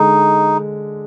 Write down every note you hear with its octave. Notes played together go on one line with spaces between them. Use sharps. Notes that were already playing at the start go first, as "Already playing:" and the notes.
Already playing: D3 G#3 D#4